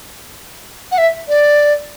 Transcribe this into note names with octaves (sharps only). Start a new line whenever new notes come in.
F#5
E5
D5